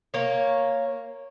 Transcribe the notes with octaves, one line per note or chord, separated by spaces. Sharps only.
A#3 C#5